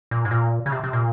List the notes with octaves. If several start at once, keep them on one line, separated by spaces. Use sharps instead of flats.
A#2
G#2
A#2
C#3
C3
C3
A#2